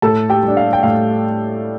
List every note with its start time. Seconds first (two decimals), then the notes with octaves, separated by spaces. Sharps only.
0.02 A2 A4 A5
0.29 G4 G5
0.43 G3 D4
0.57 F5
0.73 G5
0.83 A2 F5